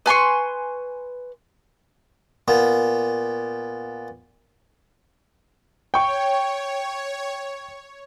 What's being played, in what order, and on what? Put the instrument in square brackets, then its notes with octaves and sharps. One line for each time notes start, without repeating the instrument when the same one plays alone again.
[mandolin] B4 G#5 C6 C#6
[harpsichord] A#2 B3
[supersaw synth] C#5 [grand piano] G5 C#6